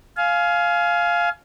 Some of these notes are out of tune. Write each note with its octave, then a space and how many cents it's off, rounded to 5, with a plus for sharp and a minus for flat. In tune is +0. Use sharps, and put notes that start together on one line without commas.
F5 +0 G#5 +25